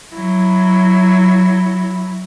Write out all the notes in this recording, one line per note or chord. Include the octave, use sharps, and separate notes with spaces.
F#3 E4